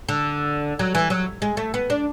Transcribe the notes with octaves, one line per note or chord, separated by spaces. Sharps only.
D3
F#3
E3
F#3
G#3
A3
B3
D4